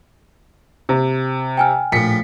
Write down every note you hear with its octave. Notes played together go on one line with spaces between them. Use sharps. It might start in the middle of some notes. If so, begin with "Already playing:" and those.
C3
G5 G#5 F6
A#1 A2 B6 C#7